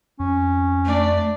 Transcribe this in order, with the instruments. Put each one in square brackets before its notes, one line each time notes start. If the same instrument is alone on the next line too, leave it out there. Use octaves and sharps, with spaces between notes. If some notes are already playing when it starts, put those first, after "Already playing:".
[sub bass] F2 [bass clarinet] C#4
[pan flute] A3 [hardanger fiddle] D4 D5